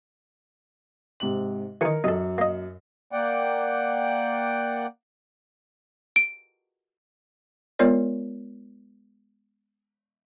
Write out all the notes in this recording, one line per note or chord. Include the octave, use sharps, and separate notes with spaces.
G#2 C3 F#7
D#3 E3 A#4 C#7
F#2 D#4 A4
A#3 D#5
A#3 D5 F#5 G5
D7
G#3 B3 F4 A#4 C#5 D5